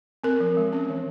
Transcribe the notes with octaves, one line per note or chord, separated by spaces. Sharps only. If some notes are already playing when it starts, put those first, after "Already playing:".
C4 A#4
F3
G#3
C#4
E3